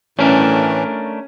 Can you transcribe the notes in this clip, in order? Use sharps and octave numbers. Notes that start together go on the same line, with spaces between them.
A2 E3 A3 C#4 D4 A#4